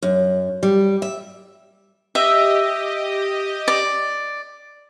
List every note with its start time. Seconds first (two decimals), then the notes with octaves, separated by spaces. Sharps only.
0.02 F#2
0.63 G3
1.02 E5
2.15 G4 D#5 E5
3.68 D5